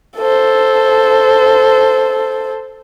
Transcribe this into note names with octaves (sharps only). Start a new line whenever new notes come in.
A4 C5